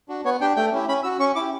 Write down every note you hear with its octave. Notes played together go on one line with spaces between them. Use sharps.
D4 F#4
B3 C#5
D4 G4 G5
A3 G5
C#4 E4 G4
C#4 B5
F#4 E6
C#4 C#6
E4 G4 D6